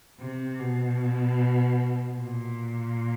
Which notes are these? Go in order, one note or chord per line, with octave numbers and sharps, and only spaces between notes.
C3
B2
A#2